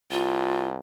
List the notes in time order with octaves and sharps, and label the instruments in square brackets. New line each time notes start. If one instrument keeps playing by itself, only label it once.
[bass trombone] C2 [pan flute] F4